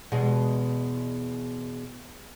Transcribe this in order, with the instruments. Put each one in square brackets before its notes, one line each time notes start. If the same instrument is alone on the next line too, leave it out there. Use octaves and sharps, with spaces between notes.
[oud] E2 B2 G#3